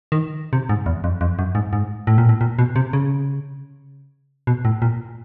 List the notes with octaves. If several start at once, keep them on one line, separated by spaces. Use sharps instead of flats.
D#3
C3
G#2
E2
F2
F2
F#2
G#2
G#2
A2
A#2
A2
A#2
B2
C3
C#3
B2
A2
A#2